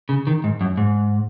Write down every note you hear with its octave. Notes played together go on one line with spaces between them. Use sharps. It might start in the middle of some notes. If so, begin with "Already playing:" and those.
C#3
D#3
G#2
F#2
G#2